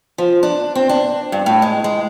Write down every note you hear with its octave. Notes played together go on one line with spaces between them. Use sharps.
F3
D4
C4
D4
G2
A2
G#3
G#3